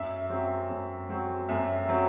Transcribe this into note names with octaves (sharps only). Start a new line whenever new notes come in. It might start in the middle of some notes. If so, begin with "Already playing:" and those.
Already playing: F#2 E5
F#3 C4
F#2
F#3 C4
F#2 E5
F#3 C4